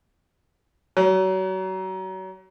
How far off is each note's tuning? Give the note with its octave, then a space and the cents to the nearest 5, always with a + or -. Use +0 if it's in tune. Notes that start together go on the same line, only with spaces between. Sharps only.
F#3 +35